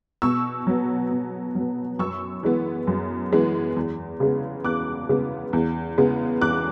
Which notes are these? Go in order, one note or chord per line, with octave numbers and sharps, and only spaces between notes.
B2 C#6 E6
F#3 B3
B2
F#3 B3
F#2 C#6 E6
E3 G#3 B3
F#2
E3 G#3 B3
E2
C#3 G#3 B3
E2 D6 F#6
C#3 G#3 B3
E2
C#3 G#3 B3
E2 D6 F#6